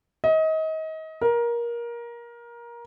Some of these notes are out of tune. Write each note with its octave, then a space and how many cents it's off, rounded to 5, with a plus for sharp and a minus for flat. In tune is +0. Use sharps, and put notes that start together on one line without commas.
D#5 +30
A#4 +20